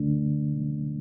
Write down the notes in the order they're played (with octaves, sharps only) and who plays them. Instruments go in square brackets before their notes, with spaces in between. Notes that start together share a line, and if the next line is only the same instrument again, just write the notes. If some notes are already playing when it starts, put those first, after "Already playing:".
Already playing: [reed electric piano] D2 D3 A3 D4